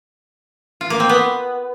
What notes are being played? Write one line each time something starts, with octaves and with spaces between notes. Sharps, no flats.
F4
A#3
C4
B3